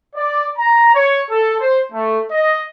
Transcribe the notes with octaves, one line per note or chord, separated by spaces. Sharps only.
D5
A#5
C#5
A4
C5
A3
D#5